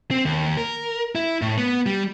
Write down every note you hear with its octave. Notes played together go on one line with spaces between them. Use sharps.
C4
D#2
A#4
E4
A2
B3
G3